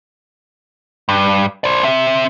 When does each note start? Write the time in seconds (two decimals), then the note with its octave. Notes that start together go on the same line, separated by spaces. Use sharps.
1.09 G2
1.64 C5 D5
1.84 C4 E5